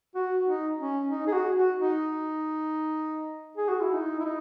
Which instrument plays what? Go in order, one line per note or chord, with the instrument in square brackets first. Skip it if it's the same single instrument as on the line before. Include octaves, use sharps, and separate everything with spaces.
[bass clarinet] F#4
D#4
C#4
D#4
G#4
F#4
F#4
D#4
G#4
F#4
E4
D#4
E4
D#4